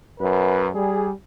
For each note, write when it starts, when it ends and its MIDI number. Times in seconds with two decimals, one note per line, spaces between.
0.20 0.68 42
0.20 0.68 71
0.73 1.10 55
0.73 1.10 68